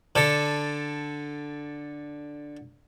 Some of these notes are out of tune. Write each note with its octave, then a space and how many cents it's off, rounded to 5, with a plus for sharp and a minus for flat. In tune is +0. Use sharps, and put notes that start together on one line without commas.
D3 +0 A4 +0